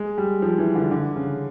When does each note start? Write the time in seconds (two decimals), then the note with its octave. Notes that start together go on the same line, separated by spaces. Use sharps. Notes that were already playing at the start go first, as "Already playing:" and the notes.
Already playing: G#3
0.18 G3
0.42 F3
0.58 E3
0.75 D3
0.91 D3
1.16 C#3